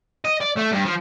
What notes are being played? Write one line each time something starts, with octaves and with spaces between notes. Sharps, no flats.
D#5
D5
A3
G2
F3